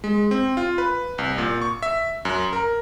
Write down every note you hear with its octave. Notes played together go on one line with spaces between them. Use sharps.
G#3
C4
F4
B4
C2
A#2
C#6
E5
F#2
A#4